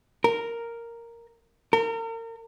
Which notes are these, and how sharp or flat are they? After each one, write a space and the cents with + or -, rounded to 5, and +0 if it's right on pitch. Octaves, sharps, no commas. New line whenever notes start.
A#4 -5
A#4 -35